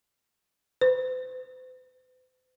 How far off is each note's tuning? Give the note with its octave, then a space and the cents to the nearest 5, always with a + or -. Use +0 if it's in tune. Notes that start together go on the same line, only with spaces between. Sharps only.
C5 -45